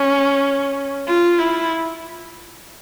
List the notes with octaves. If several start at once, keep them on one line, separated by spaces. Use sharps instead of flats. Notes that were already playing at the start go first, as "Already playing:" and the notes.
Already playing: C#4
F4
E4